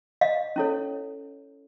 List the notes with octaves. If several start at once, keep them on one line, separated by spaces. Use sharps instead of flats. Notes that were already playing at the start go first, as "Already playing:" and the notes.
D#5 F5
C#4 E4 A4 C#5